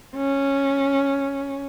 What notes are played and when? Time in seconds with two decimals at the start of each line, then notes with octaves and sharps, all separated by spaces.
0.16 C#4